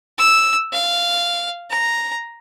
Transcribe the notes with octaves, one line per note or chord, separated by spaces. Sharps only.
E6
F5
A#5